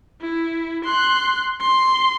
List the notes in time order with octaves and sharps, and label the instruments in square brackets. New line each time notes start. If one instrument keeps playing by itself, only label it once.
[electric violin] E4
C6 F#6
C6